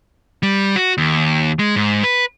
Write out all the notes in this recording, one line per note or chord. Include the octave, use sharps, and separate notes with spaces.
G3
F#4
D#2
G#3
G#2
B4